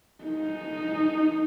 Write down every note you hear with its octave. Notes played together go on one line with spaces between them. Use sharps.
D#4